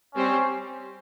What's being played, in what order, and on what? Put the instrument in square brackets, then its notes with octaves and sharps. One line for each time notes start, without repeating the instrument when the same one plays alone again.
[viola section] G3 C4 G4 C5 [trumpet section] C#4